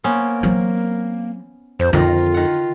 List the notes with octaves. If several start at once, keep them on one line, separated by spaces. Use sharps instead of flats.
A#3 B3 C#4 C5
F#3 C4
F2 C5
F2 D3 D#3 F4 A#4
D#3 F#5